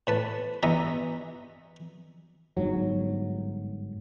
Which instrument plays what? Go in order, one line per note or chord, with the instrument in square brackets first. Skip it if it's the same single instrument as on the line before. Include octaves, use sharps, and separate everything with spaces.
[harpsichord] A2 B4 A5
G2 E3 B3 D#5 E5 A#5
[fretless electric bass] G1 G#2 F#3